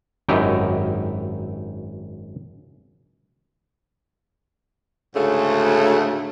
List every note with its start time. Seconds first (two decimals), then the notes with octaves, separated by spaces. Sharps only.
0.28 G#1 F#2 D#4 E4 G4
5.15 D2 G#2 C#3 A3